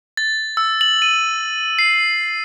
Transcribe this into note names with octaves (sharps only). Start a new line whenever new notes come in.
A6
E6
F#7
D#7
C7